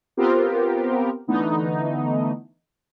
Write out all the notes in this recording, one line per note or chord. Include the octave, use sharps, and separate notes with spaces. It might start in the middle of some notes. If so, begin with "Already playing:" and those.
B3 C4 F4 G4 A#4 C5
D3 E3 A3 B3 D#4